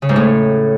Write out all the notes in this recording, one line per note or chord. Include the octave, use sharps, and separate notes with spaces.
C#3
G#2
A2